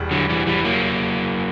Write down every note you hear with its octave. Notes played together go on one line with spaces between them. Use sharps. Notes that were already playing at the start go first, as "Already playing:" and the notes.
Already playing: E1 E2 G3
D3 F#3
E3 G3
E3 G3
F#3 A#3